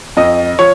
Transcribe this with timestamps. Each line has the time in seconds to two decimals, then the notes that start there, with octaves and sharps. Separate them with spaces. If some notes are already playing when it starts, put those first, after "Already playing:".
0.17 F2 D#5
0.59 F3 C#5